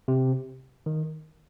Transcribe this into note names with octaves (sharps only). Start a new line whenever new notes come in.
C3
D#3